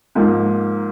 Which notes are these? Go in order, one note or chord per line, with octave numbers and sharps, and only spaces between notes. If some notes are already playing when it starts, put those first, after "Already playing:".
G#2 F3 A#3 D#4